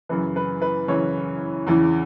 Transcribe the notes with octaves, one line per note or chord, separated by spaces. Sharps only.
F#2 C#3 E3 B4
B4
B4
F#2 C#3 E3 C#5
E2 C#3 E3